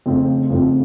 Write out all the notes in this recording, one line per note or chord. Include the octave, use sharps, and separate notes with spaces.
F2 C#3 A3 C4 F4
F2 C#3 A3 C4 F4